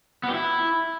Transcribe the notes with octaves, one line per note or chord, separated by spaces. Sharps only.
B3
G4
E4